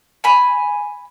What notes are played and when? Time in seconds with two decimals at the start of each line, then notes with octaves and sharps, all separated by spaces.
0.24 G#5 B5